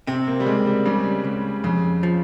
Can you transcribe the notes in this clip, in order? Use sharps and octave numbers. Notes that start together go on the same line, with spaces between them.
C3 C4
A#3
G3
C#2 G#3
G3
C#3 G3
C#2
F2 C#3
F3